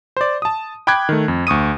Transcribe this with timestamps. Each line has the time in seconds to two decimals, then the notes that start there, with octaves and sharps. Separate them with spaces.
0.17 C5 D5
0.42 A5 D#6
0.87 G5 B5 D6 F#6 G#6
1.09 D#3 A3
1.28 F2
1.47 D2 C#6 D#6 D#7